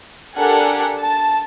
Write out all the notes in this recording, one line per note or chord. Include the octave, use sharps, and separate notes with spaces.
D4 G4 A4 A#4 F#5 G#5
A5